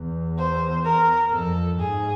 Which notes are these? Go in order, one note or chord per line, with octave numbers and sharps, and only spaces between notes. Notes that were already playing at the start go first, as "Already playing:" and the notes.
Already playing: E2
C5
A#4
F2 A4
G#2 G#4